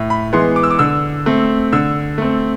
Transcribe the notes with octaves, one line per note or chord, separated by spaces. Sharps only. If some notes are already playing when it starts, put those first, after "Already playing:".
Already playing: A2
B5
E3 G#3 B3 C6
D6
E6
D6
D3 E6
A3 C4
D3 E6
A3 C4